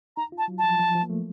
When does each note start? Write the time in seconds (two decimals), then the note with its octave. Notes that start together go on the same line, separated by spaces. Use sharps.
0.17 D#4 A#5
0.32 F4
0.38 A5
0.48 F#3
0.58 A5
0.63 F3
0.79 F3
0.95 F3
1.03 A#3
1.10 A3